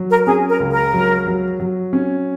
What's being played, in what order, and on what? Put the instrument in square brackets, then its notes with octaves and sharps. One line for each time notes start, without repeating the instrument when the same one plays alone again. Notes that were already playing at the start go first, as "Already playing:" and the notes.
Already playing: [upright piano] F#3
[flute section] A#4
[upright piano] C#4 [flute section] G#4
[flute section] A#4
[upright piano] C#2
[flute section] A#4
[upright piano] F#3
F#3
F#3
C#4